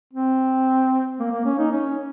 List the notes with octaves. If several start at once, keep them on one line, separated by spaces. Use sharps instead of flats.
C4
A#3
A#3
C#4
D#4
C#4